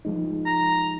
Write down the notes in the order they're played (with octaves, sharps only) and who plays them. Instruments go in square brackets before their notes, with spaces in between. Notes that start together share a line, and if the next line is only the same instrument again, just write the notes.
[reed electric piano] F3 G#3 D#4
[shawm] A#5